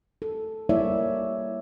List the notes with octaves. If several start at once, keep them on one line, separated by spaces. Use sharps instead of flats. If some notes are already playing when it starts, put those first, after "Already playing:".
A4
G3 A#3 E4 C#5 D5 E5